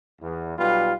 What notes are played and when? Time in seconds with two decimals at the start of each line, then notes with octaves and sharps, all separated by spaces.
0.21 E2
0.57 B1 G3 F4 B4